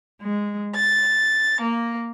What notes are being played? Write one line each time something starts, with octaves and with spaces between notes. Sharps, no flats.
G#3
A6
A#3